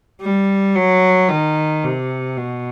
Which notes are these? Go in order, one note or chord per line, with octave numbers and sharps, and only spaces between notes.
G3
F#3
D#3
C3
B2